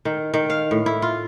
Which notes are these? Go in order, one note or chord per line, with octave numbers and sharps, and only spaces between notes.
D#3
D#3
F5
A2
E4
F4